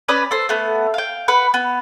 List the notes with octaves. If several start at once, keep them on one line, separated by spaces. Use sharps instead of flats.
C#4 B4 D5 D#6
A4 C5
A3 B3
F5 G5
B4 F#5
B3